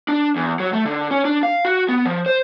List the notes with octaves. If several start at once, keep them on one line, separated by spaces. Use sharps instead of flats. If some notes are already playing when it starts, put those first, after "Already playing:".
D4
E2
F#3
A3
D3
C#4
D4
F5
F#4
B3
F3
C5